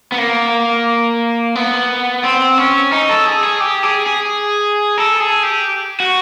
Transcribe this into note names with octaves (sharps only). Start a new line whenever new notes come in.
B3
A#3
B3
C4
C#4
D#4
A4
G#4
G#4
G4
G#4
G#4
A4
G#4
G4
F#4